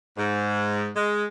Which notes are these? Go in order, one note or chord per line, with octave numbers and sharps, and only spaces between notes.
G#2
G#3